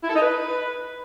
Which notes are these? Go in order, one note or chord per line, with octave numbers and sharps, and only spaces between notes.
E4
A4
D#4
B4